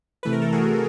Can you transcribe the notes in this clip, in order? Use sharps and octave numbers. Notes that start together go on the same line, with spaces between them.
C3 E3 A3 B4
A#4
A4
F#4 G#4